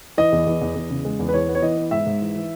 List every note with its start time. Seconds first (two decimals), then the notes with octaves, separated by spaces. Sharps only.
0.18 E3 D#5
0.32 E2
0.46 E2
0.61 E2
0.75 E2
0.90 C#3
1.05 G#3
1.19 E2
1.29 B4
1.34 E3 C#5
1.49 B3
1.55 C#5
1.62 E3 D#5
1.77 B3
1.91 G#2 E5
2.06 G#2
2.21 E3
2.36 E3